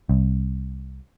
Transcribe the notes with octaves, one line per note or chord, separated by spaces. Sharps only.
C2